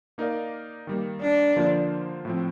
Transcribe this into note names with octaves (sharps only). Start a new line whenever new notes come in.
A#3 D#4 A#4 D5 F5
D#3 G3 A#3
D4
D3 F3 A#3 F4 C5
A2 F3 C4